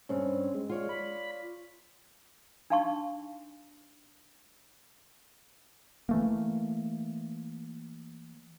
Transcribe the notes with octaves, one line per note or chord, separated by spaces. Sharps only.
G2 C4 C#4
G#3
F4 C#5 D5
B5
D4 D#4 F5 A5 C6 C#6
E3 A3 A#3